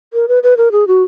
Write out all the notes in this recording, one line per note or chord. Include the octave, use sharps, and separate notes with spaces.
A#4
B4
B4
A#4
G#4
F#4